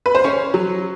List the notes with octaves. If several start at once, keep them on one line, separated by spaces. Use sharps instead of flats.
B4
C5
C#4 C#5
F#3